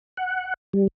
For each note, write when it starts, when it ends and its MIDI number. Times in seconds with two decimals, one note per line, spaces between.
0.17 0.54 78
0.73 0.87 55